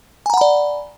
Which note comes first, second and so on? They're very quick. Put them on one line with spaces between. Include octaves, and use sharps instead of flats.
G#5 A#5 F#5 B5 D5